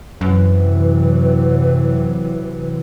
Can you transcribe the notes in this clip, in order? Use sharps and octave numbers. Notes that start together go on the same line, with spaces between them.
F#2 C3 E3 F#3 B4